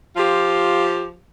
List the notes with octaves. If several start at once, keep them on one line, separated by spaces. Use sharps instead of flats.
F3 F4 G4